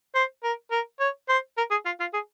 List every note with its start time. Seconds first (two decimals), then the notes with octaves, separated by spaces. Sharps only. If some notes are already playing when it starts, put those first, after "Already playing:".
0.15 C5
0.44 A#4
0.71 A#4
1.00 C#5
1.29 C5
1.58 A#4
1.71 G#4
1.85 F4
2.00 F4
2.14 G#4